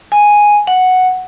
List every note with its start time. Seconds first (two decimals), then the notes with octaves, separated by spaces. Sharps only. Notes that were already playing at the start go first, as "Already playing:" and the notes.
0.12 G#5
0.67 F#5